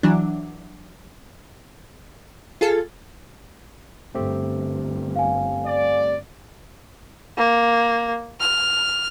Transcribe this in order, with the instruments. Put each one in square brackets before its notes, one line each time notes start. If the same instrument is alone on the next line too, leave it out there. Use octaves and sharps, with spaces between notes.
[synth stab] E3 F#3 D4
F4 G#4 A4
[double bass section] G1 [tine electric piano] A3 C4 G4
[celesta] F5 G#5
[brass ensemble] D5
[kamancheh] A#3
F6